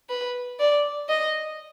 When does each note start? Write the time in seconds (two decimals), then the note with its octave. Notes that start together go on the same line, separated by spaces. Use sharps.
0.09 B4
0.59 D5
1.09 D#5